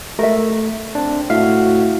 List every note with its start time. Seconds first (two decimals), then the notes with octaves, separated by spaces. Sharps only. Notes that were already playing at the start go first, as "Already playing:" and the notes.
0.19 A3 A#4 E5
0.95 C4 D4
1.30 A2 F#4 E5 F5